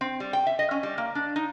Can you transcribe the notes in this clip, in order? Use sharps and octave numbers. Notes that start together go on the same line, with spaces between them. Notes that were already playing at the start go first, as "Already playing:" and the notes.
C4
G3
G5
E5
D#5
C#4
G3
A#3
D4
D#4